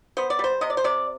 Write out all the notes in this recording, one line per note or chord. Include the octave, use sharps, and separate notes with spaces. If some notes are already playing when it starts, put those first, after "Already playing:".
B3 C5
D5
G3 C5
C3 D#5
D5
C5
C3 D5